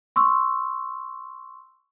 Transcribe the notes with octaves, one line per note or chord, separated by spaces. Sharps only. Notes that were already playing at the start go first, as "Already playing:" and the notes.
C6 C#6 E6